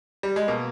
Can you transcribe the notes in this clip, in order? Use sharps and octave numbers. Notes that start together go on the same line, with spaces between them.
G3
G#3
B2 A#3